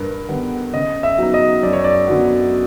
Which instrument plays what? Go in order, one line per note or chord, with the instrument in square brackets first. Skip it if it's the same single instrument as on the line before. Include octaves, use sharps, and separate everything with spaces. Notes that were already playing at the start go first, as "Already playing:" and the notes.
Already playing: [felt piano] G2 [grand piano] A#4 B4
[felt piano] D3 G3 B3
[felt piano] C#3 [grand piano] D#5
[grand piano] E5
[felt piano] F#3 B3 D#4
[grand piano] D#5
[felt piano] F#2 [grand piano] D5
[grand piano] C#5
D5
[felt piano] D3 F#3 B3